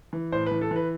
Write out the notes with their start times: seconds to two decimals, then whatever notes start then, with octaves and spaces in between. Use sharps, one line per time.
0.13 E3
0.32 A2 C5
0.46 E3 B4
0.61 A4
0.71 E3 B4